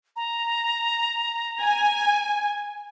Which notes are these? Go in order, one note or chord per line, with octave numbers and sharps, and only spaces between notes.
A#5
G#5